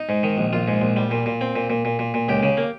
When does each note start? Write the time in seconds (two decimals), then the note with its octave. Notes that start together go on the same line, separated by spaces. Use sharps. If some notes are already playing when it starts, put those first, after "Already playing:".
Already playing: D#4
0.09 G#2
0.23 D#3
0.38 A#1
0.53 A#1 F4
0.68 G#2
0.81 A#1
0.96 G3
1.11 A#2
1.26 A#2
1.41 C4
1.56 A#2
1.70 A#2
1.85 A#2
1.99 A#2
2.14 A#2
2.28 C#2 G4
2.43 C#3
2.57 A#3